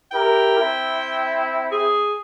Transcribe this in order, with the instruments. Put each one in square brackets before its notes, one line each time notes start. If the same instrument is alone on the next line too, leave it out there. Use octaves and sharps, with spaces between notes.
[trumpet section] E4 G4 A#4 [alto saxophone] G5
[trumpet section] C4 E4
[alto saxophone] G#4